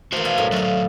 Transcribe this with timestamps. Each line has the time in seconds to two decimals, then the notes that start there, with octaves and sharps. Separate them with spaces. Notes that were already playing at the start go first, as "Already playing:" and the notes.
0.12 E3 A#3 F#4 C5
0.25 B2 D5 G#5
0.38 F#2 A2 C3
0.52 F#3 A3 F4 D#5